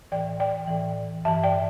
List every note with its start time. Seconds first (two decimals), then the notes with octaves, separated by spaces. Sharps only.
0.12 A2 E3 D5 G5
0.40 D5 G5
0.68 A2 E3
1.25 G2 E5 A5
1.28 E3
1.43 D5 G5